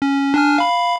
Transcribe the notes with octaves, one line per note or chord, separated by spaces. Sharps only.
C#4
D4 G#5 F6
F5 B5